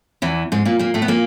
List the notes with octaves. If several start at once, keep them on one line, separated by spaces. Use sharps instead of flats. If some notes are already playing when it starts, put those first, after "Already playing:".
E2 E3
G#2 G#3
A#2 A#3
A#2 A#3
A2 A3
B3
A#2 A#3